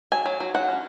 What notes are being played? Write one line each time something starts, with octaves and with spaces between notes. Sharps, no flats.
F#3 G#5
F#3
F#3
F#3 F#5
C#4